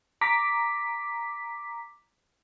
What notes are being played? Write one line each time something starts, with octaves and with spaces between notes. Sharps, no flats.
A#5 D6 B6